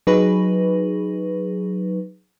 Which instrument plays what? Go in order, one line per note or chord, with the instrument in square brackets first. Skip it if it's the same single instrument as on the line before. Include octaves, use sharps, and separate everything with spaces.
[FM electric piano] F#3 D#4 G#4 B4